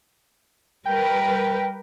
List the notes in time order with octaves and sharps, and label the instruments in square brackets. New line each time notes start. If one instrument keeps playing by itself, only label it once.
[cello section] G3 A#4 B4 [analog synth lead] G5